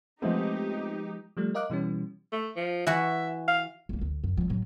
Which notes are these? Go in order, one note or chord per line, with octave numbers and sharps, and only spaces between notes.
F3 G#3 A3 B3 C4 D#4 G4
F3 G3 A3
A#4 D#5 F5 D6 F#6
B2 E3 G3 C#4
A3
F3
E3 F#4 E5
F5
C#2 A#3
D2
F#2
F3 G3
A2 F#3